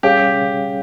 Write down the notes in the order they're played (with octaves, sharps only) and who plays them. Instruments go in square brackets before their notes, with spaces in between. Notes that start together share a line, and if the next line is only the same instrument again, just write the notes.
[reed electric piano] G3 C#4 G#4 C#5 F5 [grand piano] G4